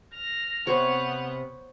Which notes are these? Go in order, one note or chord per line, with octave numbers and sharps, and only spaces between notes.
F6 A#6
C3 B3 C5 C#5 F#5